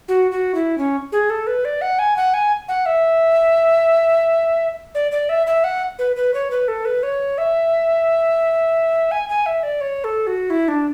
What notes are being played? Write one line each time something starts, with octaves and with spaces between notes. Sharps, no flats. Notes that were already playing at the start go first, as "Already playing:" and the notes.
F#4
F#4
E4
C#4
G#4
A4
B4
D5
F#5
G#5
F#5
G#5
F#5
E5
D5
D5
E5
E5
F#5
B4
B4
C#5
B4
A4
B4
C#5
E5
G#5
G#5
E5
D5
C#5
A4
F#4
E4
D4